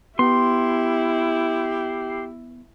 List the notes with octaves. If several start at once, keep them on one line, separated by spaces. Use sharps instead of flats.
B3 E4 G4 C6